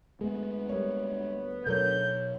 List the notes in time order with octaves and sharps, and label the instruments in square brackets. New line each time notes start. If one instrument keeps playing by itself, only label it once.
[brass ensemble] D2 B3 [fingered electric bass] G#3 A3 [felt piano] G#4
[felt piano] G3 A#4 C#5
[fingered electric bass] B2 F#3 [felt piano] A4 A#4 C#5 [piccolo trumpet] G6